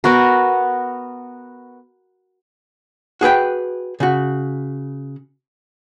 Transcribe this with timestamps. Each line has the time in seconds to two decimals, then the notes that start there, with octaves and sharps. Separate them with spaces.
0.04 B3 F#4 A#4
3.21 F#4 G#4 B4 G5
4.00 C#3 F#4